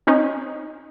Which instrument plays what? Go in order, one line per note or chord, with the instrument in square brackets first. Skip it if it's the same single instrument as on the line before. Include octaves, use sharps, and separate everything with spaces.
[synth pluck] C4 C#4 D#4